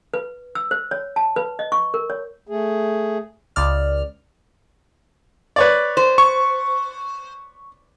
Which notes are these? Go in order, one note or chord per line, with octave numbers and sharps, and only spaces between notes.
B4
E6
C5
C#5
A5
B4
D#5
C#6
A#4
C#5
A3 G#4
C#2 D5 F6
B4 C#5 D5
C5
C#6